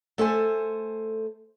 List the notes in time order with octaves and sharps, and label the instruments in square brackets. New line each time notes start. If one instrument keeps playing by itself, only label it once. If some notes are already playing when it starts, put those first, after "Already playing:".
[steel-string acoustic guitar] A3 A4 C5 G#5